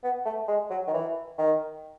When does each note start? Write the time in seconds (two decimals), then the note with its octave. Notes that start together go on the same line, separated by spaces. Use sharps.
0.03 B3
0.25 A3
0.48 G#3
0.70 F#3
0.87 D#3
0.93 E3
1.38 D#3